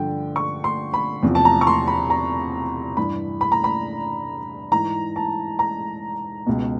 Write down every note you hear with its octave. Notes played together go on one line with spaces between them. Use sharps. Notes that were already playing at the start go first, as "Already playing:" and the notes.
Already playing: G2 D3 F3 G5
C#6
C6
B5
E2 C3 F3
A5
A#5
C#6
C6
B5
A#5
G2 E3 B5
B5
A#5
B5
G#2 E3 A#5
A5
A#5
C#2 B2